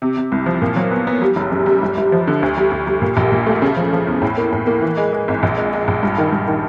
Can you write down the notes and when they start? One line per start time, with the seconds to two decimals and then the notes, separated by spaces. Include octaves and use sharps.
0.02 C3
0.17 C3
0.32 C2
0.46 F3
0.62 A#2
0.76 F#3
0.91 B3
1.07 B3
1.22 G3
1.36 F#1
1.52 F#2
1.66 G3
1.82 G1
1.97 G1
2.12 F3
2.27 D3
2.42 D2
2.57 G3
2.71 D2
2.87 G3
3.02 A#2
3.17 A#1
3.32 A#2
3.47 A3
3.62 C#3
3.77 F3
3.93 F3
4.07 E2
4.22 A2
4.37 A#3
4.53 A2
4.67 A#3
4.82 E3
4.97 G#3
5.13 G#3
5.28 G#1
5.43 A#1
5.58 G#3
5.73 G#3
5.88 A#1
6.03 G2
6.18 D#3
6.32 G2
6.48 D#3